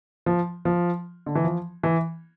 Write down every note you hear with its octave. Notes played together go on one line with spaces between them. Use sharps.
F3
F3
D3
E3
F3
E3